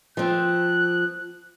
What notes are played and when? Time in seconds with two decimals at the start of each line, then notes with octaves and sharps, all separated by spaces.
0.17 F3 C4 F#6